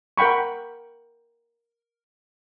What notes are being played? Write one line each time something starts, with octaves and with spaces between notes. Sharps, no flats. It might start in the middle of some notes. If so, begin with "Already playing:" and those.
A#4 F#5 G5 B5 C#6